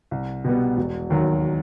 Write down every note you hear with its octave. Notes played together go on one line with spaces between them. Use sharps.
C2
B2 G3 B3
E1
D#2 D#3 F#3